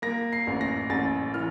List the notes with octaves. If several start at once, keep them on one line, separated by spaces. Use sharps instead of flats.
A#3 A#6
C7
A1
A#6
A1 A6
E3 F6